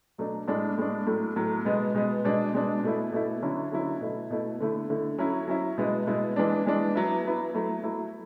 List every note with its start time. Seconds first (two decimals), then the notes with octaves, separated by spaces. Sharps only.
0.18 B2 F#3 A3 D4
0.48 A2 G#3 D4
0.78 A2 G#3 D4
1.07 A2 F#3 A3
1.36 A2 F#3 A3
1.65 B2 G#3 B3
1.94 B2 G#3 B3
2.25 B2 G#3 D4
2.54 B2 G#3 D4
2.83 B2 A3 E4
3.12 B2 A3 E4
3.42 D3 F#3 C#4 E4
3.72 D3 F#3 C#4 E4
4.01 B2 A3 E4
4.30 B2 A3 E4
4.60 D3 A3 E4
4.90 D3 A3 E4
5.18 F#3 C#4 E4
5.48 F#3 C#4 E4
5.78 B2 G#3 B3 E4
6.07 B2 G#3 B3 E4
6.36 E3 G#3 D4
6.66 E3 G#3 D4
6.95 F#3 B3 E4
7.25 F#3 B3 E4
7.54 F#3 A3 E4
7.84 F#3 A3 E4